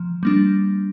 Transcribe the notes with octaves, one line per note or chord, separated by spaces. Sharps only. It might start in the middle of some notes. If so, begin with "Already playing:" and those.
Already playing: F3
G3 A#3 D4